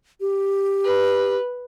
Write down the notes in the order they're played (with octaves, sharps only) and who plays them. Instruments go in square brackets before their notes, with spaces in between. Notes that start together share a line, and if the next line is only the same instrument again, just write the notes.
[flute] G4
[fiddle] B4